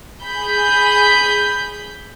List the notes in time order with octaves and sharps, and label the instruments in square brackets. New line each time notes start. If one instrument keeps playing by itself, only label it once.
[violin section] G#4 B5 G6